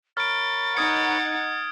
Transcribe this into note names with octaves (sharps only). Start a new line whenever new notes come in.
A#4 C#5 B5 F6 A6 D7
D#4 F#5 D#6 G#6 C#7